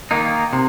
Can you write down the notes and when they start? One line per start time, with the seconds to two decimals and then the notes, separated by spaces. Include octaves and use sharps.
0.11 D#3 A#3 D#4
0.53 C3